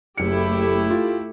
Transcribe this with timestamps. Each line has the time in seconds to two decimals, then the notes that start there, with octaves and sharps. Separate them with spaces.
0.18 F#1 A3 E4 G4 C#7
0.90 F4